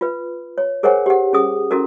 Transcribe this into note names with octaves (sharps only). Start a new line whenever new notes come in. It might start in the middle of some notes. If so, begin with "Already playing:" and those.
F4 B4
C#5
G#4 A#4 C5 C#5 F#5 G#5
G4 F#5
C#4 G#4 D#6
C#4 E4 F#4 A4 A#4